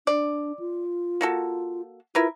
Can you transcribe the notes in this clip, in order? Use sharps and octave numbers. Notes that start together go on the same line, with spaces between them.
D4 D5
F4
A#3 F#4 A4
E4 F4 A#4 B4